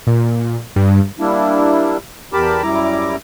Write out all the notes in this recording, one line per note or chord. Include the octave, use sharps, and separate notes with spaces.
A#2
G2
G3 A#3 D4 E4
E2 G4 A#4 A5 B5 D6
F#2 G3 E4 A#5 D6